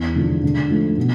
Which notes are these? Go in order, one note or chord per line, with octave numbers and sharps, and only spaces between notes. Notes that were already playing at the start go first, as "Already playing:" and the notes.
Already playing: E2
D3 F3
D3
F3 A3
B2